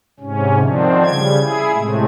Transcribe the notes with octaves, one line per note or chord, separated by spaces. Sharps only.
G#2 C3 C#4
D3 D#3 F3 C4 D4
C#3 G3 G#6
E4 G#4
A2 C3 G#3 A3